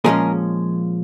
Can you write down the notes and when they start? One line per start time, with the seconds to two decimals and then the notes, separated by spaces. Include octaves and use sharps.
0.04 A#2 F3 G#3 C#4 G#4 A#4